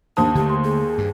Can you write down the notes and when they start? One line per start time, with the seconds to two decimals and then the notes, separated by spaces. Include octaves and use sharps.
0.17 D#2 D4 C5 A5 D#6
0.35 D3 A3 G4
0.50 C6
0.64 G#4
0.98 G2